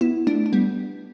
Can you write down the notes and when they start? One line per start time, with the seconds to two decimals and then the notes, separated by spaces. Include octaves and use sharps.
0.01 B3 E4
0.27 A3 D4
0.46 D4
0.53 G3 B3